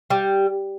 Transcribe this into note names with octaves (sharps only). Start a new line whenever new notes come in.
G3